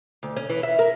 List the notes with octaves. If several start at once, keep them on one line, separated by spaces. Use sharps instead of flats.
D2
C#4
E3
E5
A#4